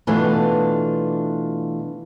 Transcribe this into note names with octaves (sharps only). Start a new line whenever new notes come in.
B2 E3 A3 D4 F4 B4